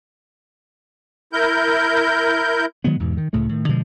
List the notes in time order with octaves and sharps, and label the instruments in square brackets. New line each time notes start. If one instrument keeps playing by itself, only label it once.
[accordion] E4 A#4 G6
[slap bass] D#3 F#3 G#3 B3
E2 G#2 B2
D#3
C#2 A2 C#3 A3
A2 D#3
B2 D3 F3 G#3